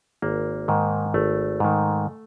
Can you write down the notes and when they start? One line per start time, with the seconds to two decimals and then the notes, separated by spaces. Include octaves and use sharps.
0.22 G#1 A#3
0.68 G#2 D#3
1.14 G#1 A3
1.60 G#2 D#3